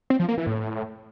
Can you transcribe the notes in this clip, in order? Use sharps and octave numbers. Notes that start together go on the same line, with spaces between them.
C4
F3
A#3
E3
A2